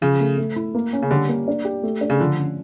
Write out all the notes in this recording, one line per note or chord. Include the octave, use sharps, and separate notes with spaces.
C#3 F3
A3
A3
E4
A#3
C#4
C#3
D3 G3
A#3
D4
G4
A3
D4
C#3
D3 F3
C#4